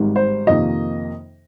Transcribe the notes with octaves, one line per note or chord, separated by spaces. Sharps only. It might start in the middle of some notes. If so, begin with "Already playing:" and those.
Already playing: G#1 G#2 G3
C5
F2 C3 D#3 A#3 D#5